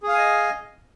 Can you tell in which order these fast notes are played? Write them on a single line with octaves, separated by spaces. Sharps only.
G#4 F5 G#5 D#5